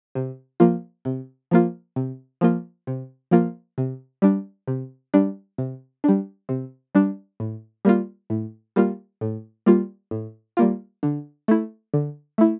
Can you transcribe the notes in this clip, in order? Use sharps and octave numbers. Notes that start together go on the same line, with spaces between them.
C3
F3 A#3 F4
C3
F3 A#3 F4
C3
F3 A#3 F4
C3
F3 A#3 F4
C3
G3 D4
C3
G3 D4
C3
G3 D4
C3
G3 D4
A2
G3 A#3 F4
A2
G3 A#3 F4
A2
G3 A#3 F4
A2
G3 A#3 F4
D3
A3 E4
D3
A3 E4